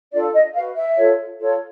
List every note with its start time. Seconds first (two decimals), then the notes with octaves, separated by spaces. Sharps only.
0.12 D4 F4 A4 D5
0.33 D#5
0.55 F#4 B4 F5
0.75 E5
0.96 F4 A4 C#5
1.38 F4 A4 C#5